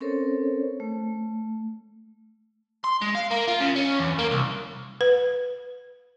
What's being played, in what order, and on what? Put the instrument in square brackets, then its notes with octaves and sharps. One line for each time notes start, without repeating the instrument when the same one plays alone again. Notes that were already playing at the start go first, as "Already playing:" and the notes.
[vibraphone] C4 C#4 A4 A#4 C5 C#5
A3
[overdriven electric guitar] C6
G#3
F5
A#3
F4
C#3
C#4
E2
A#3
C2
[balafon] B4